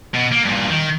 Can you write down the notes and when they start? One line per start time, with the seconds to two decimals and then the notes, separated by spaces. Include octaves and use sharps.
0.14 B2
0.32 A#3
0.44 G2 A#2
0.70 D#3